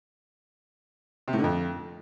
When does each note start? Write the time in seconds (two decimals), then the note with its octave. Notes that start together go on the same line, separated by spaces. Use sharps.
1.28 C3
1.33 A2
1.38 D3
1.44 F2